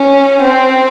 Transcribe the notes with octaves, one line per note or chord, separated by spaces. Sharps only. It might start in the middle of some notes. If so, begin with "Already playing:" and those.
Already playing: C#4
C4